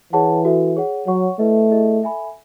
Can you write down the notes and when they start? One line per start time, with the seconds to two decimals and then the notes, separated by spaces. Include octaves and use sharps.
0.13 E3 G#4 C#5 F#5 A5
0.45 F#4 A4 E5
0.76 G#4 C#5 F#5
1.07 F#3 C#5 F#5 C#6
1.39 A3 E4 B4 D#5
1.70 E4 G#4 D#5
2.02 A4 E5 G#5 B5